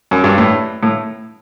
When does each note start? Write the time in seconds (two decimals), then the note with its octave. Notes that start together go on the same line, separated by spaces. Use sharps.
0.11 F#2
0.24 G2
0.38 A2
0.83 A2